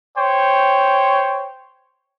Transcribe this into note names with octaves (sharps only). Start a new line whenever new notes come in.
C5 C#5 G5